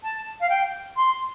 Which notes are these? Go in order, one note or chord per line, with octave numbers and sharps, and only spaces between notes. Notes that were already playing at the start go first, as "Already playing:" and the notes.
A5
F5
G5
C6